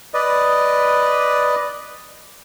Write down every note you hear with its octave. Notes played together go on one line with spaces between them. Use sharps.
B4 D5 D#5